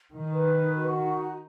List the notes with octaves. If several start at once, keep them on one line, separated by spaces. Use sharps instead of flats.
D#3 D#4
B4
D#4
F#4
D#4